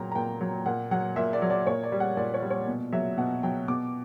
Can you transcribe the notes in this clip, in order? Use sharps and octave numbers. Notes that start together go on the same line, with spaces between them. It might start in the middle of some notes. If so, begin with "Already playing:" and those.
Already playing: A#2 F#3 G5 A#5
A#5
A#2 G5
F#3
A#2 F#5
F#3 F#5
A#2 E5
D5
F#3
D5
A#2 C#5
D5
G3
F#5
A#2 D5
C#5
G3
C#5
B2
F#3 E5
B2 F#5
F#3 G5
B2 D6